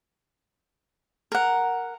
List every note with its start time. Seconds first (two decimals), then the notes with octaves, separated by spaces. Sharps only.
1.32 A#4 F#5